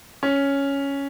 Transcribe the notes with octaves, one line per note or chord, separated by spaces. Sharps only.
C#4